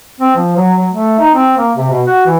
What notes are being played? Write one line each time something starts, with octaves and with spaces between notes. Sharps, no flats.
C4
F3
F#3
F#3
A3
D#4
C4
A#3
C3
B2
F#4
E3